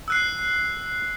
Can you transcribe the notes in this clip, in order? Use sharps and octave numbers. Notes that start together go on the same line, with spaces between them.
E6 F#6 C7